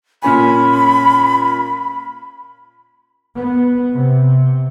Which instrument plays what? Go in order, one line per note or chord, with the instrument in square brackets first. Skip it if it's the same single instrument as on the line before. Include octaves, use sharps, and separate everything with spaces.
[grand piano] A#2 C#4 G#5 [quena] B5
[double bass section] B3
C3